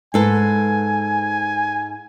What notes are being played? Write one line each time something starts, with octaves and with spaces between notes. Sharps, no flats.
G#2 A4 B4 G#5